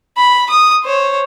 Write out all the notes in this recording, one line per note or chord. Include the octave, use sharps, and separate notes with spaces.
B5
D#6
C5 C#5